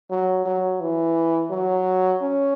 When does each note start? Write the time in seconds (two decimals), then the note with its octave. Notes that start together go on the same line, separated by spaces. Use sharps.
0.10 F#3
0.45 F#3
0.80 E3
1.51 F#3
2.21 C#4